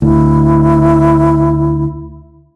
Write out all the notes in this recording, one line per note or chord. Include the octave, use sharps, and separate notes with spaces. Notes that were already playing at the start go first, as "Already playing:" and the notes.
D2 E4